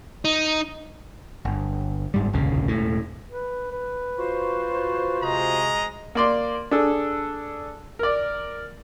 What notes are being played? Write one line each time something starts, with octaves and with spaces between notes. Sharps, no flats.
D#4
G1
G1 G#2 G3
F1 A#1 D#2 C#3
E1 A2
B4
B4
F4 F#4 C5
C3 G#3 D#5 A#5
A#3 D5 C6
D4 G#4 A4
A#4 D5